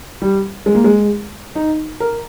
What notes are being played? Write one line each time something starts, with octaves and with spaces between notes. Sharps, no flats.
G3
G#3
A#3
G#3
D#4
A#4